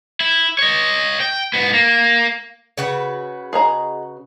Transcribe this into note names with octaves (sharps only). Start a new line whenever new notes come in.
E4
C#5 D#5
G5
G#2 B3
A#3
C#3 F#4 B4
G#4 D#5 A#5